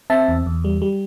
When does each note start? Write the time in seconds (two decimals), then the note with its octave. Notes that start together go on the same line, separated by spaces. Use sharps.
0.10 C4 E5 A5
0.28 E2
0.46 E2
0.64 G3
0.82 G3